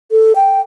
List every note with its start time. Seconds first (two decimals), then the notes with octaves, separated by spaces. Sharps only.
0.11 A4
0.35 G5